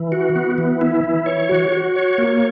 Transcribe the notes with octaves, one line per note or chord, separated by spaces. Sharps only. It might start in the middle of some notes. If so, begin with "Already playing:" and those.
Already playing: E3
F#4
B3
E3
E4
E3
C#5
F#4
F#4
C#5
A#3